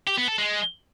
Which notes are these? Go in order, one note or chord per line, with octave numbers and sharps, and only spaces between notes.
G4
B3
A4
G#3